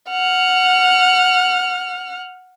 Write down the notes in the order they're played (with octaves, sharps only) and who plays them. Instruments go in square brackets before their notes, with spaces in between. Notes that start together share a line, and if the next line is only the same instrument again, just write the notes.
[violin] F#5 F6